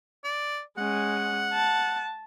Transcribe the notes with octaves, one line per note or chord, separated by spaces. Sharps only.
D5
G#3 C#4 F#5
A5